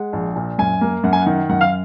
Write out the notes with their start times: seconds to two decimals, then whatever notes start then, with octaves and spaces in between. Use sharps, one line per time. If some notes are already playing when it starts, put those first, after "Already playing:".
Already playing: G#3 F#5
0.13 A#1
0.36 A#2
0.58 F#2 G#5
0.81 A#3
1.03 F#2 F#5
1.13 G#5
1.22 D#3 F#5
1.49 F#2 F#5
1.61 F5